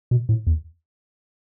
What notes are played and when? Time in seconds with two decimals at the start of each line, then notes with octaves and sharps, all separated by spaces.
0.11 B2
0.29 A2
0.47 E2